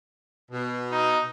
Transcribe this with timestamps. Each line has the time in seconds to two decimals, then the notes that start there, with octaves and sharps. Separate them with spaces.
0.51 B2
0.92 D#4